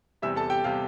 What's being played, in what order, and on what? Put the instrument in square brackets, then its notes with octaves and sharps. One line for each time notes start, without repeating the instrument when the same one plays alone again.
[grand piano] E2 C3 G3 E5 E6
A4 A5
G4 G5
C3 G3 F5